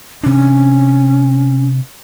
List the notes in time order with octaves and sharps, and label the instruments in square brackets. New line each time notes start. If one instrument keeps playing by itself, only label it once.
[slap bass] C3 D4 [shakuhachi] C#4